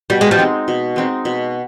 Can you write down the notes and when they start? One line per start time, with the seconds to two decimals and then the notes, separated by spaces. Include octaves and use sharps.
0.10 B2 G3
0.21 G#3
0.31 F3 G3
0.38 G#3 C4 D#4
0.68 B2
0.96 G#3 C4 D#4
1.25 B2